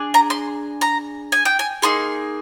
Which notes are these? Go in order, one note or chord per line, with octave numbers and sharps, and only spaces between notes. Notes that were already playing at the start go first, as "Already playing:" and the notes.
Already playing: D4 G#4
A#5
C6
A#5
G#5
G5
G#5
A#3 D#4 G#4 C6